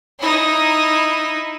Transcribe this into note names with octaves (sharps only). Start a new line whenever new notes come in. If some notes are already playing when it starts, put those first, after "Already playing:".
D#4 E4